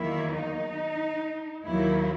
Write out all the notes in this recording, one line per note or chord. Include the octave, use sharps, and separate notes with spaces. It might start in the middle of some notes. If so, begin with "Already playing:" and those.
Already playing: E2 D#3 F#3 A#3 E4
D#4
D#2 D#3 F#3 A#3 E4